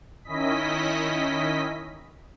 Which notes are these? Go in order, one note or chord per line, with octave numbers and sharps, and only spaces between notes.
D#3 C#4 E4 D#5 B6